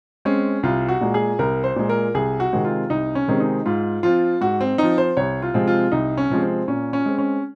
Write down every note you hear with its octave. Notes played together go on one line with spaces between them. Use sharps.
G#3 C4 C#4
C2 F4
F#4
A#2 G#3
G#4
C2 A#4
C5
A#2 G#3
A#4
C2 G#4
F#4
C3 D#3 G#3 C4
F4
C2 D#4
C#4
C3 D#3 G#3 C4
D#4
G#2 F4
F3 C4 F4
G#2 F#4
C4
F3 C4 D#4
C5
C2 C#5
F4
C3 F3 G#3 C4
F4
C2 D#4
C#4
C3 F3 G#3 C4
C4
A#2 C#4
C#4
G#3 C4
C#4